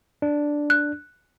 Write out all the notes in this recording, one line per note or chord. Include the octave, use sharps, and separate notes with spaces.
D4
F#6